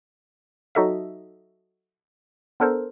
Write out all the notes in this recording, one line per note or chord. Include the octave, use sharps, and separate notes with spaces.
F#3 D#4 F#4 A4 D#5 E5
B3 D4 A4 A#4 C5